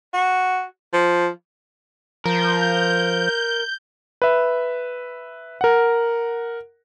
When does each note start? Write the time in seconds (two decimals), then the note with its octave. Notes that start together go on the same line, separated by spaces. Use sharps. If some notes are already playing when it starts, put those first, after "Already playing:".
0.13 F#4
0.93 F3
2.26 F3 A#4 G6
4.22 B4 E5
5.61 A#4 F#5